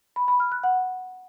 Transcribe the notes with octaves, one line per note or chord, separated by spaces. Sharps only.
B5
B5
F6
F#6
F#5